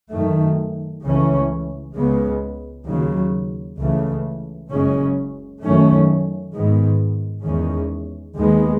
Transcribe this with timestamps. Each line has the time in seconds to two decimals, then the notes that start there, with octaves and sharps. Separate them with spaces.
0.11 F#2 D#3 A3
1.04 C#2 C#3 E3 A3 C#4
1.95 C#2 C#3 G#3 B3
2.87 D#2 C#3 F#3
3.78 C#2 C#3 E3 A3
4.70 F#1 F#2 C#3 G#3 C#4
5.61 F#2 D#3 F#3 A3 C#4
6.53 G#2 D#3 G#3 B3
7.45 E2 D#3 G#3 C#4
8.36 D#2 D#3 G#3 B3